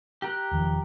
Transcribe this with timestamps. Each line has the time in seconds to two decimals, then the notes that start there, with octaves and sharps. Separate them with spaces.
0.22 G4 A#4 F#6
0.51 E1 D#3 F3